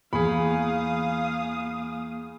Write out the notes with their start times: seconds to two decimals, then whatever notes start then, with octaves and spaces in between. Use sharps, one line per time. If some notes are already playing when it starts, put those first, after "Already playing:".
0.13 E2 A#3 G#4 F5 B5 D#6